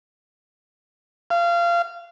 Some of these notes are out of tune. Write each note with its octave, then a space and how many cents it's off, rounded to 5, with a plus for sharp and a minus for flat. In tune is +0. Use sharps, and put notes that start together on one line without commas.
F5 -25